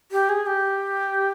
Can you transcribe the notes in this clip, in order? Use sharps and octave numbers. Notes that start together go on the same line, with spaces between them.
G4
G#4
G4